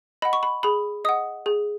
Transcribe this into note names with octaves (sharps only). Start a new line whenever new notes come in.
D#5 F#5 B5
C#6
B5
G#4 B5
D#5 F#5 D#6
G#4